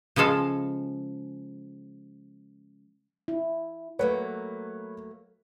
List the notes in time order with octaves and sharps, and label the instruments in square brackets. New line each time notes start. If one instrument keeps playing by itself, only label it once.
[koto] C#3 F3 G#3 A4 F5
[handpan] E4
[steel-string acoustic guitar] F#3 A3 A#3 [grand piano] B4 C#5